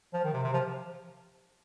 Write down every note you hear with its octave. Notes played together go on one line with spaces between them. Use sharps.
F3
D#3
C3
C3
F3